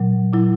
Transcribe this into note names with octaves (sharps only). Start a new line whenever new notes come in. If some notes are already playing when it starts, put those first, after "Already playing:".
Already playing: A#2 F#3
A#2 F#3 E4